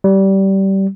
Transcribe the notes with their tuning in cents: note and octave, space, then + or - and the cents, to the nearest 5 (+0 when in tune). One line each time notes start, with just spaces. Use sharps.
G3 -20